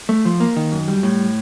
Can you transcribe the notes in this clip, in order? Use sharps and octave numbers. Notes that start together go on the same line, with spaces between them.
A3
F3
A#3
D#3
F#2
G3
A2